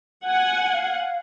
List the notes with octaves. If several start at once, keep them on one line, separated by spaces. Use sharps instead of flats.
F#5 G#5
F5